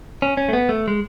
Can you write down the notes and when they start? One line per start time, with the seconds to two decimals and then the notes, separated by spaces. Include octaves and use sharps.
0.22 C#4
0.37 C#4
0.49 A3
0.53 B3
0.69 A3
0.88 G#3